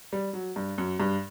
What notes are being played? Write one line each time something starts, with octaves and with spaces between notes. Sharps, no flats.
G3
F#3
G2
F#2
G2